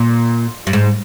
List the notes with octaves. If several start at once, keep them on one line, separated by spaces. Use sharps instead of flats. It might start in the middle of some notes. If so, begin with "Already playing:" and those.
Already playing: A#2
G2
G#2